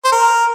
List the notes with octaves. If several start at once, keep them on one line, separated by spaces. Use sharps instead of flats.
C5
A#4